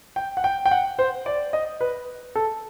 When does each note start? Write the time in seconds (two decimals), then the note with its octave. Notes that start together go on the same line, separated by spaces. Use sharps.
0.16 G5
0.37 F#5
0.44 G5
0.66 G5
0.71 F#5
0.99 C5
1.26 D5
1.53 D#5
1.81 B4
2.35 A4